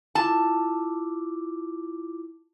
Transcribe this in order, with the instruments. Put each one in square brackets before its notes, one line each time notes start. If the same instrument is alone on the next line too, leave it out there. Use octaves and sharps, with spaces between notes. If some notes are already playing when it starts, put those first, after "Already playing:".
[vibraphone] E4 F4 D6 [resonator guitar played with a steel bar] A5